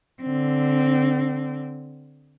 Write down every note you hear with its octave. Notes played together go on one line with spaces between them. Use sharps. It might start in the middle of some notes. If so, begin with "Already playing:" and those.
D3 C4